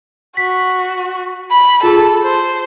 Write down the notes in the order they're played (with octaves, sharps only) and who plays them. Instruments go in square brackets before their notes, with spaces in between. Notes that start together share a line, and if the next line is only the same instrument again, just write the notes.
[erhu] F#4 [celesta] B6
[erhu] B5
[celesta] F4 G#4 A5 [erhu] A4
[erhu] C5